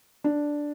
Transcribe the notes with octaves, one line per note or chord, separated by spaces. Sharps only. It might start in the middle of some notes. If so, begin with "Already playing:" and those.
D4